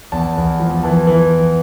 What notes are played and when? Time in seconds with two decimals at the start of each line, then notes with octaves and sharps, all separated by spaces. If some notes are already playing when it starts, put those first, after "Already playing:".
0.12 E2 A5
0.37 E2
0.60 F3
0.83 E3 A5
1.07 E3